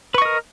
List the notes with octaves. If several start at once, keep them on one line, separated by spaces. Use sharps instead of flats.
A#4 B4 D#5 C#6